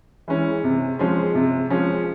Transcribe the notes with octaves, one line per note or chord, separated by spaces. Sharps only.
E3 G#3 C#4
C3
F3 G#3 C#4
C3
F3 G#3 C#4